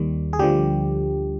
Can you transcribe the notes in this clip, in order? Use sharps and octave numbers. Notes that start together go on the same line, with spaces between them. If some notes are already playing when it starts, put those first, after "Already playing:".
Already playing: D#2 D#3 G3
G#4
D2 D3 F3 G3 G4